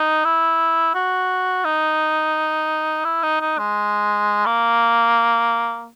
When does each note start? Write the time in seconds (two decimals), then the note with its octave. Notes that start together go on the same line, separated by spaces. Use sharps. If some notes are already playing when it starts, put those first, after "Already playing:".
Already playing: D#4
0.25 E4
0.94 F#4
1.65 D#4
3.05 E4
3.23 D#4
3.41 D#4
3.58 G#3
4.46 A#3